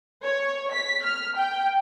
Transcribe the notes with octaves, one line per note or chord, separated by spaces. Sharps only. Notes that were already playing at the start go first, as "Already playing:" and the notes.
C#5
B6
F6
G5